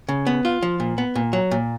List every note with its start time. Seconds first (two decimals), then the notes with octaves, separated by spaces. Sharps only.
0.09 C#3
0.27 B3
0.45 F4
0.62 F3
0.80 A#2
0.98 B3
1.16 A#2
1.33 F#3
1.51 A#2